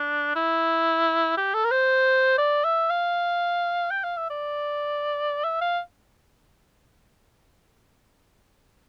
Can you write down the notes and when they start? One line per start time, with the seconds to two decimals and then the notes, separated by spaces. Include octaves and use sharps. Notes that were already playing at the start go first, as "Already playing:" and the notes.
Already playing: D4
0.36 E4
1.37 G4
1.54 A4
1.65 A#4
1.71 C5
2.38 D5
2.64 E5
2.90 F5
3.91 G5
4.04 F5
4.17 E5
4.30 D5
5.44 E5
5.61 F5